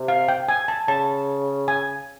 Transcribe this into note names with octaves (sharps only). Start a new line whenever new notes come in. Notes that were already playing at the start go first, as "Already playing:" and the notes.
Already playing: C3
F5
G5
G#5
A5
C#3 A5
G#5